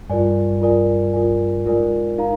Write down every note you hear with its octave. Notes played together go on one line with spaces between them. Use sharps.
G2 F4 A#4 D5 G#5
F4 A#4 D5 G#5
F4 A#4 D5 G#5
G#2 F4 A#4 D5 G#5
D#4 A#4 F5 A#5